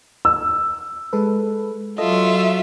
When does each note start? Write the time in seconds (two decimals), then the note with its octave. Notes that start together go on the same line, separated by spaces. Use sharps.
0.25 E6
1.13 G#3 A4 B4
1.98 F#3 F4 A4 D#5 E5